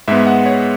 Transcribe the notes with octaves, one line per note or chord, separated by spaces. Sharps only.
G#2 G#3 B3 E5
F#5
C#5